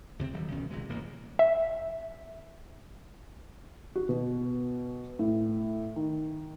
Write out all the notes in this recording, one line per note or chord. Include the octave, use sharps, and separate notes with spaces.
C#2 C3 B3 C4
D#1 D#3 F#3 G3
D2 B2 D#3 C#4
A#1 C3 G#3
D1 A1 A#3
E5
F#4
B2
A2
D#3